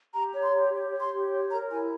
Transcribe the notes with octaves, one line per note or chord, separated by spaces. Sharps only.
G4 A#5
C#5
C6
G4
G4
C#5
C6
G4
C#5
A#4 A#5
E4 G#5